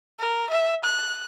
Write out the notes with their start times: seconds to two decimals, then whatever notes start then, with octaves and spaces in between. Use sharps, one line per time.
0.20 A#4
0.50 E5
0.84 F#6